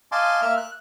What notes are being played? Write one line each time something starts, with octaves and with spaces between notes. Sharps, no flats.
D#5 F5 G#5 A5 C6 D6
A#3 E5 F6
F#6